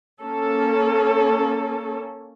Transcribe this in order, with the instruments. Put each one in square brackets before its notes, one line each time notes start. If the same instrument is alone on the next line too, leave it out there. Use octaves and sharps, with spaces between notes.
[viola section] A#3 C#4 A4